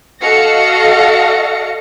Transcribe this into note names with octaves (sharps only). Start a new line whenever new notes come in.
F#4 A4 D#5 F5 A#6 C#7